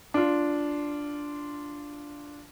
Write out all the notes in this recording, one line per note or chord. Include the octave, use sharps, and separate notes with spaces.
D4 F4